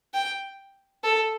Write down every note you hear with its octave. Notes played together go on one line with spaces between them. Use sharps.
G5
A4